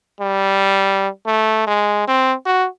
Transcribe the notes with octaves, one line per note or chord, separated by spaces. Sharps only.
G3
A3
G#3
C4
F#4